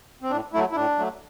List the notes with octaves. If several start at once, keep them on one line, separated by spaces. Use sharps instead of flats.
C4
A2 D4
F#3 A3 E4
E4
A2 D4
F#3 A3